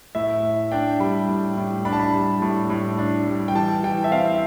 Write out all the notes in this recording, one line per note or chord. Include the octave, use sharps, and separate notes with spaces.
A2 E5
A2
D4 G5
G3 B5
A2
A2
D4 B5
A5
B5
G3
A2
A2
D4
G3
G5
E3 A5
E3 G5
E5
C4 F5